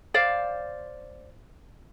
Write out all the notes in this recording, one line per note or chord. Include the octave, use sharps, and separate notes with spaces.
C5 D5 F5